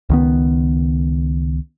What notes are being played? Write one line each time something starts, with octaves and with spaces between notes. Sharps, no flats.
C#2 D#3 B3